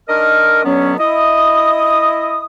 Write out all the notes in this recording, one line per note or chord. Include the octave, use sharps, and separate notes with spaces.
D#3 D4 A#4 D#5 F6
B2 D3 F#3 B3 C#4
E4 D#5 D#6